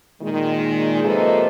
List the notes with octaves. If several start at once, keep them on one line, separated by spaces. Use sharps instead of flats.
A#2 D#3 G#3
C3 F3 A#3 A4 B4 D#5